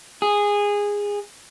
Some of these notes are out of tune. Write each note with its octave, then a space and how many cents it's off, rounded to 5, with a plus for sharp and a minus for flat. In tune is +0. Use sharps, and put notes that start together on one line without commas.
G#4 -15